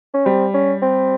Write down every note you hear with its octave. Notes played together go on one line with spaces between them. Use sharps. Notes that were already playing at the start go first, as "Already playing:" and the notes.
C#4
G3 C4
C#4
C4